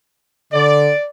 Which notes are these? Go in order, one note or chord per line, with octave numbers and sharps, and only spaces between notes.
D3 D5